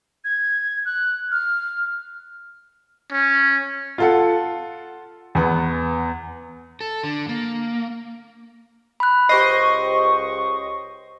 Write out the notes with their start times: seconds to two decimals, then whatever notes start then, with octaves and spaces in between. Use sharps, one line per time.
0.25 G#6
0.85 F#6
1.32 F6
3.12 C#4
3.98 F4 A4 F#5
5.35 E2 B3
6.81 A4
7.03 D3
7.29 A#3
9.00 B5 F#6
9.29 C#2 G4 C5 D#5 C#6 C7